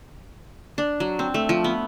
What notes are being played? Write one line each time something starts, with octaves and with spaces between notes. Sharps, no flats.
D4
F#3
C4
A3
F3
B3